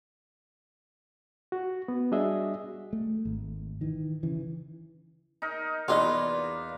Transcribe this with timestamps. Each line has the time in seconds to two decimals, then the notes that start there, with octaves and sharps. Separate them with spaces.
1.52 F#4
1.88 B3
2.12 G3 D4 F#4 G#4 D#5 E5
2.93 A3
3.25 G#1
3.81 D#3 E3
4.23 C#3 E3
5.42 D#4 A#4
5.88 E2 F#3 A#3 D#4 F4 B4 D5 D#5